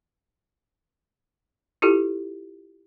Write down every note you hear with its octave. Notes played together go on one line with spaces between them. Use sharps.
E4 F4 G4 A4